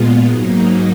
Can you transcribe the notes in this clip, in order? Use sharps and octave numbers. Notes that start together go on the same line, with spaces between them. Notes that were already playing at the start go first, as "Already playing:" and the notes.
Already playing: A#2 G#3 B3 F4
G#2 F#3 A#3 D#4